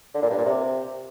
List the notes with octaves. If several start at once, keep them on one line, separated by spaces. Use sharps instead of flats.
D3
A#2
G2
A#2
C3